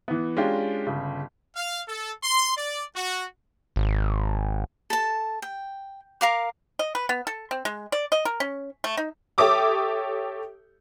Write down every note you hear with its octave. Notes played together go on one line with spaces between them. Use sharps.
E3 B3
G#3 C#4 D4 F4 G4
G1 C#3
F5
A4
C6
D5
F#4
G#1
A4 A5
G5
A#4 F5 D6
D#5
B4
B3
A4
C4
G#3
D5
D#5
A#4
C#4
A3
D#4
G4 A4 C#5 E5 D6 D#6